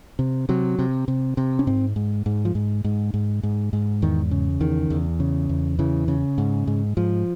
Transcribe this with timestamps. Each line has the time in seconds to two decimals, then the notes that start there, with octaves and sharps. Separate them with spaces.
0.19 C3
0.49 C3 F#3
0.79 C3
1.08 C3
1.37 C3
1.59 C#4
1.67 G#2 C4
1.96 G#2
2.26 G#2
2.45 F3
2.55 G#2
2.84 G#2
3.14 G#2
3.43 G#2
3.73 G#2
4.02 E2 D#3
4.31 C#3
4.60 E2 D#3
4.90 E2
5.20 C#3
5.49 E2
5.79 C#3 E3
6.08 C#3
6.38 G#2
6.67 G#2
6.97 G#2 F3